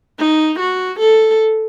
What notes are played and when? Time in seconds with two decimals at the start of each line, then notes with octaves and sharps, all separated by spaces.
0.19 D#4
0.59 F#4
1.00 A4